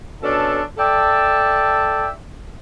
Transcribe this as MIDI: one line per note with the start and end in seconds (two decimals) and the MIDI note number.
0.22 0.61 47
0.22 0.61 61
0.22 0.61 62
0.22 0.61 69
0.78 2.06 69
0.78 2.06 74
0.78 2.06 76
0.78 2.06 79
0.78 2.06 81